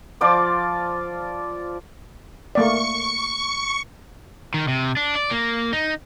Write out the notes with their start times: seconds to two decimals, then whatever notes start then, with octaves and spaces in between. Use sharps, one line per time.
0.21 F3 F4 D5 D6
2.55 A3 A#3 D5 C#6 C#7
4.54 D#3
4.68 C3
4.97 D4
5.15 D5
5.31 A#3
5.73 D#4